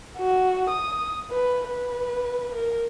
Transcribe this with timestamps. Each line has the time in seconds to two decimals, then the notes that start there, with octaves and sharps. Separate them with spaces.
0.18 F#4
0.70 D#6
1.31 B4
1.68 B4
2.55 A#4